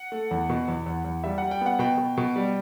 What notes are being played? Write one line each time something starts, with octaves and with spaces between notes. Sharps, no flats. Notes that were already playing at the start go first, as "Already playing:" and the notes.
Already playing: F#5
A3
E2
B2
E2
E2
E2
G3 E5
G3 F#5
G5
B3 F#5
B2 G5
B2
B2
G3